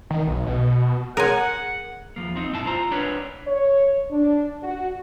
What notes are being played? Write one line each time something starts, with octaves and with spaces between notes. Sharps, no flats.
D#3
B1
B2
G#4 A#4 C#5 F#5 G#5 C6
E2 F3 A#3
C4 D#4
B1 G2 E4 A5
F4 C5 A#5
D4 A#4 B4 C#5
C#5
D4
F#4